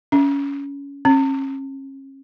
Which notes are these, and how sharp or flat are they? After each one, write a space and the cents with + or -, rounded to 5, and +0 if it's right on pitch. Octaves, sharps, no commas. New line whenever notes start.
C#4 +20
C#4 -40